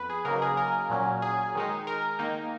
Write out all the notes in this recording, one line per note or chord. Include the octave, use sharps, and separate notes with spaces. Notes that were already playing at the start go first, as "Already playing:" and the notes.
Already playing: F2 B3 B4
G#4
C#3 F#3 A#3 D#4 A#4
G#4
A#4
A#2 F#3 C#4
G#4
D#3 G#3 D#4
A#4
D#3 A#3 D#4